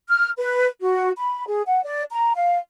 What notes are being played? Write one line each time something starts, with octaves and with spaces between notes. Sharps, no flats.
F6
B4
F#4
B5
G#4
F#5
D5
A#5
F5